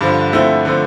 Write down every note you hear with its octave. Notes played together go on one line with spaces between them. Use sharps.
G2 D3 F3
D3 F3 A3 C4 E4
D3 F3 A3